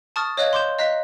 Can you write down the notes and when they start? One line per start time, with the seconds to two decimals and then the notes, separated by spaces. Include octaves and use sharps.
0.16 A5 C#6 D#6 F6 A6
0.37 C#5 D#5 F5 F#6 G#6
0.53 C6 D6 G6 E7
0.79 D#5 F5 A#5 F#6 B6